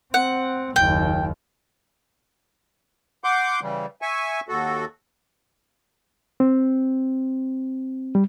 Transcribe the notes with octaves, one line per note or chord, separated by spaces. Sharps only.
C4 F#5
F#1 D#2 G5
F#5 C6 D6 G6
C#3 E3 G3
E5 G#5 C#6
D#2 F#4 A4
C4
G3